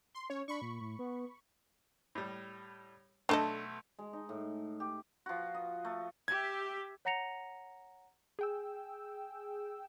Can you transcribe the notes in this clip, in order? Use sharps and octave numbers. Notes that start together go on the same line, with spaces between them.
C6
C#4 C#5
D4 B5 C#6
A#2
A2
B3
A2 G3
B1 A3 D4 A4 D#5
G#3
D#4
A2
G4
F3 F#4
D#5
A3
G4 E5 G#6
C#5 F#5 A#5 A#6 C#7 F7
G#4 G5 E6